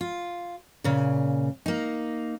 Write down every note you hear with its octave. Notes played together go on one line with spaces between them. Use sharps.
F4
A#2 C#3
A#3 D#4